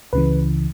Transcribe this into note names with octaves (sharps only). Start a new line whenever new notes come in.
C#2 C#3 E3 B4